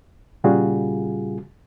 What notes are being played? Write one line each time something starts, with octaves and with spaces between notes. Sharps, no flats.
A#2 C#3 G3 F4 F#4 G#4